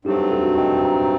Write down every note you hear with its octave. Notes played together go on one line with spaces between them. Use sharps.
G2 F#3 A3 C4 D#4 G4
F#4 A4
D#5 G5
G5 A#5